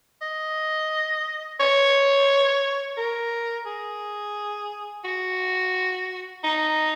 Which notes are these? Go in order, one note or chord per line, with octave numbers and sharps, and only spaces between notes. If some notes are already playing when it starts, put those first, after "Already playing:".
D#5
C#5
A#4
G#4
F#4
D#4